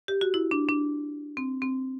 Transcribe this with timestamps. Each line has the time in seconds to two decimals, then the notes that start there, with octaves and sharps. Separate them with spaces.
0.08 G4
0.21 F#4
0.34 E4
0.51 D4
0.69 D4
1.37 C4
1.62 C4